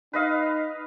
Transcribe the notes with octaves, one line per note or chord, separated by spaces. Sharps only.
D#4 B4 D#5 F5